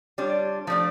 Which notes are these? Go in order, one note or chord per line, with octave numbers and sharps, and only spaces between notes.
G3 D4 F4 C#5
F3 A3 D4